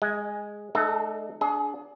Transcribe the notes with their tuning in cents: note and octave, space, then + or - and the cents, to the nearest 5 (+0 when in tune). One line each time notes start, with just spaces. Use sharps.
G#3 +0 D#5 -25
A3 -45 D#4 -40 A4 +10
D4 -10 G#4 +25